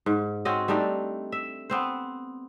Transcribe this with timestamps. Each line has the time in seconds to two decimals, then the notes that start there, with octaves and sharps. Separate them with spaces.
0.06 G#2
0.45 C4 C#4 F#4 D#5
0.68 G3 A3 D4 D#4
1.32 E5
1.70 B3 C4 C5